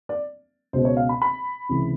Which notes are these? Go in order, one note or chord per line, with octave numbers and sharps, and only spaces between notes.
D5
C#2 B2 C5
C#5
F5
B5
B5
C#2 C3 E3